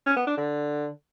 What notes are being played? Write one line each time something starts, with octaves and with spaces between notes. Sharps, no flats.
C#4
B3
D4
D3